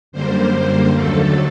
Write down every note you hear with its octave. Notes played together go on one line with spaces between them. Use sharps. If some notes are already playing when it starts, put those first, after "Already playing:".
F#2 D3 G3 A#3 C5
D#2 D3 F#3 A3 A4